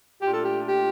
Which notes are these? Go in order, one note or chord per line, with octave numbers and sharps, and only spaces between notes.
A#2 A3 D4 F4 G4
A4
G4
G4